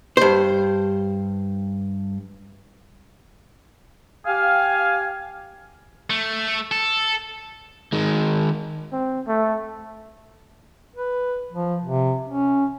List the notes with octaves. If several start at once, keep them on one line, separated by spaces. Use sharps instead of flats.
G2 C5
G4 F5 G#5
A3
A4
D#3 G#3
C4
A3
B4
F3
C3
C#4